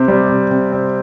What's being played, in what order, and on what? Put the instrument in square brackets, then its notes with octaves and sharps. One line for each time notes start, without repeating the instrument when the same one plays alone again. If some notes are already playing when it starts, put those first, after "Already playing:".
Already playing: [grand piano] C3 C4
G3
C3
C3
C4